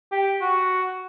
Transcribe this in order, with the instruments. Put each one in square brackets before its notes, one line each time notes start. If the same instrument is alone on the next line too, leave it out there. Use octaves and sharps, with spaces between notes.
[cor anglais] G4
F#4